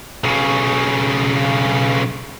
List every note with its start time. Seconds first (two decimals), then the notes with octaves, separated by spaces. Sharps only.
0.24 B1 C#3